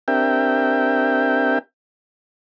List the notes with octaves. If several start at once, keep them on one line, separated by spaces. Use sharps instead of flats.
C4 D4 G4 A#4 E5 G5